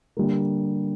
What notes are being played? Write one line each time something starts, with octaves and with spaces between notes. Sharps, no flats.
D3 G3 A#3